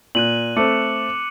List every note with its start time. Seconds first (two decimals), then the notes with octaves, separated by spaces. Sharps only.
0.15 A#2 F#6 D#7 F#7
0.56 A3 C4 D6 C#7 F#7